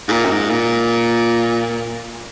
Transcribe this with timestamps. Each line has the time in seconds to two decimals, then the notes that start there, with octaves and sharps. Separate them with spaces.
0.08 G#2
0.12 A#2
0.25 F#2
0.31 G#2
0.51 A#2